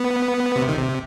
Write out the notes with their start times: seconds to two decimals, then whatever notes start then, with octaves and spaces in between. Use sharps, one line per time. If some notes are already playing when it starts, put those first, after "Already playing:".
Already playing: B3
0.56 C3
0.69 D#3
0.77 C3